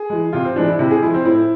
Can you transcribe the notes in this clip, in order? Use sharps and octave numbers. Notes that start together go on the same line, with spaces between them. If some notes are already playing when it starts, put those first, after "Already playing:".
Already playing: G#4
E3 G#3
C3 F4
C4
E3 G#3 D4
E4
C3 E4
G#4
F3 G#3 E4
C4
A2 E4